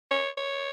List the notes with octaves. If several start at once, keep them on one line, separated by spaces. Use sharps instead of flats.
C#5
C#5